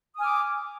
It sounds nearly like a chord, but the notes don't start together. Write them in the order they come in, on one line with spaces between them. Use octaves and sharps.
D#6 G#5 F6 D6